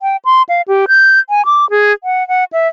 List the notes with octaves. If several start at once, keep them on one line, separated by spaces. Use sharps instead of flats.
G5
C6
F5
G4
G6
G#5
D6
G#4
F#5
F#5
E5